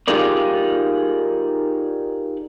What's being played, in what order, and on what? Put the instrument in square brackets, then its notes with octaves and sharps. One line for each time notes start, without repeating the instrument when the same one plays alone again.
[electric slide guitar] D#4 F4 G4 G#4 A#4 D5